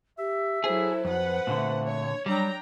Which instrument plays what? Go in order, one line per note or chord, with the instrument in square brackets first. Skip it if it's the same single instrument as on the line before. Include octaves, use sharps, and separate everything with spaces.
[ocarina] G4 [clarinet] E5
[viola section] F#3 E4 A4 [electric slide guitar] G#4 [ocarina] C5
[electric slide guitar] F2 [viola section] B4 F#5
[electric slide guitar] A#2 D3 [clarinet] A3
[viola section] C#5
[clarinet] F#3 [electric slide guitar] G3 [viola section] D4 G5 A#5